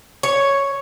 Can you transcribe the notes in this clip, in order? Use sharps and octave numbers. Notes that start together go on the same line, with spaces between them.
C#5